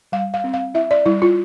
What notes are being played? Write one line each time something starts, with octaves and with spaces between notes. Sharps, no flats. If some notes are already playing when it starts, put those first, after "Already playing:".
G3 F5
F5
C4
F5
E4 E5
D5
G3 E4
F4